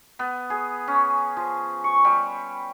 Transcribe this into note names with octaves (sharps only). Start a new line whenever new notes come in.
B3
G#4
C#4
F3
C#6
G3